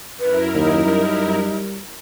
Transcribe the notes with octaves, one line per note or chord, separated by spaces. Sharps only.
F#2 E4 A#4 B4
D#2 D#4
G3